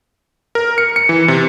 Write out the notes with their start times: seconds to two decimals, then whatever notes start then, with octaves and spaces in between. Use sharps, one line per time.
0.55 A#4
0.78 C#7
0.96 C#7
1.09 E3
1.28 C3